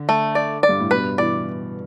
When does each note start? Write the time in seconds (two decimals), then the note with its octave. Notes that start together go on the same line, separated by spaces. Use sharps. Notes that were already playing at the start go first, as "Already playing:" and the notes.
Already playing: D3
0.09 A3
0.35 D5
0.63 D5
0.69 G2
0.80 A2
0.91 G2 B2 B4
1.18 B2 E3 D5